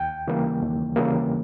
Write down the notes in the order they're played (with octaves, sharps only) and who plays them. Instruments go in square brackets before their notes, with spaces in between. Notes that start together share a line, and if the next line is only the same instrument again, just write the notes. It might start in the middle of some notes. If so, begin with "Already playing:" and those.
Already playing: [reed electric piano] D#2 G5
C#3 E3 G3 A#3
D#2
C#3 E3 G3 A#3